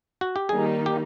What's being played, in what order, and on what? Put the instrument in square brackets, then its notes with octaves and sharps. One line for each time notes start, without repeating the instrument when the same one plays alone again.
[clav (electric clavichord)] F#4
G4
[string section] D#3 G3 A#3 D#4 [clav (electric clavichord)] G#4
[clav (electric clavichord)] G4